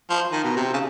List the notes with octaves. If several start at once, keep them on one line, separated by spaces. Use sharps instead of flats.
F3
D#3
B2
C3
C#3